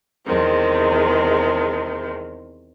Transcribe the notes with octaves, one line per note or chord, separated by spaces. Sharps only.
E2 C3 D#3 G#3 C4